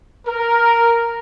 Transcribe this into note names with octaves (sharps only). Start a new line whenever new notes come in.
A#4